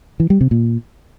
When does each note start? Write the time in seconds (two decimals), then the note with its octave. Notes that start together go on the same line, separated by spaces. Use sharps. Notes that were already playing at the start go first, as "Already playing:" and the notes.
0.20 E3
0.30 G3
0.41 C3
0.51 A#2